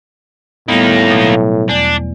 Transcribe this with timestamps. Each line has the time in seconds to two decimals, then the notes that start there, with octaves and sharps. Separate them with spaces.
0.68 A2 G3 A#3 B3 D#4
1.10 B2 F#3 A3
1.69 E2 D4 D5